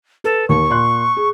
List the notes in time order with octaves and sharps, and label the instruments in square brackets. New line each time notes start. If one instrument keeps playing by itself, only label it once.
[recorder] A4 [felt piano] B4
[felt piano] D#2 [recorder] C#6
[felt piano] A#2 C6 F#6
G#4